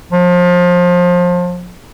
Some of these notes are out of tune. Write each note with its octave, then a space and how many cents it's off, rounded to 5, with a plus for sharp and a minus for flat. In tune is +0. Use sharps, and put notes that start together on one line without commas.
F3 +25